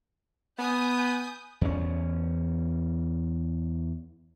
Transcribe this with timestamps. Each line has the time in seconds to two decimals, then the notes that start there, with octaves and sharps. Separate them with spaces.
0.59 B3 G#5 D#6 G6
1.61 E2 C#4